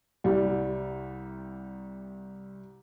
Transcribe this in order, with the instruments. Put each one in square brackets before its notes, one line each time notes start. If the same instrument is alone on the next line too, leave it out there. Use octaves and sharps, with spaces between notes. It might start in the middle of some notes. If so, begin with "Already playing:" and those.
[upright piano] C2 G3